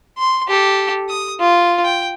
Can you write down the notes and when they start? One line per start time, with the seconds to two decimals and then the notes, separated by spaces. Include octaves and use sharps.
0.18 C6
0.48 G4 A4
1.09 D#6
1.40 F4
1.84 G5